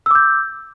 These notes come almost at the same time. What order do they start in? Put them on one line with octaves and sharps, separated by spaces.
E6 D6 G6